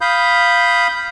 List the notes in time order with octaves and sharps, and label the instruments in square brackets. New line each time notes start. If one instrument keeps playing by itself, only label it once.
[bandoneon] F5 B5 D#6 G6